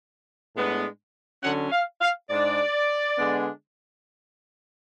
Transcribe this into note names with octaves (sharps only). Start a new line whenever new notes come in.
A2 G#3 B3 D4
D3 F#3 C#4 F#5
F5
F5
G#2 G#3 D4 D5
D3 G#3 B3 D4